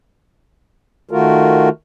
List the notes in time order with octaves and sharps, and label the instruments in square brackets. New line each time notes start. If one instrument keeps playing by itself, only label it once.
[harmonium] D#3 A3 F4 F#4 A#4